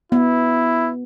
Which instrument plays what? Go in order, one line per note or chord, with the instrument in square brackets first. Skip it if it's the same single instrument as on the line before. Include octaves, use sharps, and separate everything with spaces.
[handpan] B3 [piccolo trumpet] E4